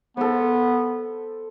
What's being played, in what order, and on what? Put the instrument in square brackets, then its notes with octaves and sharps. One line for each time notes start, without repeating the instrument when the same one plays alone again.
[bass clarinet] B3 [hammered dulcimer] A4 C5